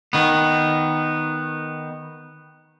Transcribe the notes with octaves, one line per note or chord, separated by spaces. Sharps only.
D#3 B3